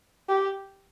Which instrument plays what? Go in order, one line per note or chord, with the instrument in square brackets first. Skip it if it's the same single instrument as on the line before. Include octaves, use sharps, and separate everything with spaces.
[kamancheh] G4